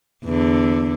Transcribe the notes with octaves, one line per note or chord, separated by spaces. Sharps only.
E2 D3